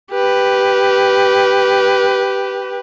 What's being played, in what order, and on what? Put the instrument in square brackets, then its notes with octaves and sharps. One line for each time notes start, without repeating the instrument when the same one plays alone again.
[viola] G4 B4